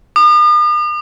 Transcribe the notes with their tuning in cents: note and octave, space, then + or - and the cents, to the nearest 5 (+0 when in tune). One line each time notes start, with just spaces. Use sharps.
D#6 -45